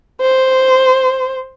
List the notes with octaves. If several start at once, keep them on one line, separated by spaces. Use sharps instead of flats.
C5